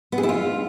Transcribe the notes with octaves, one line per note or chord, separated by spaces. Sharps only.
B3
G#4
E4
F4